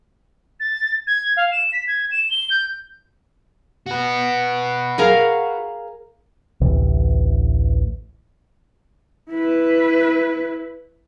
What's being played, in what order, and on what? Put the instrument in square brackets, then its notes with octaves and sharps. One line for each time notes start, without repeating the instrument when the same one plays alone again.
[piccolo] A6
G#6
F5
E7
B6
G#6
E7
G7
G6
[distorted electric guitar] F#4 B4
[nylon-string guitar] G#4 A#4 F5
[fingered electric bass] A1 D2 C3 E3
[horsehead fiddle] E4 B4